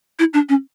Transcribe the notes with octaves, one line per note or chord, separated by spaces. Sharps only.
E4
D4
C#4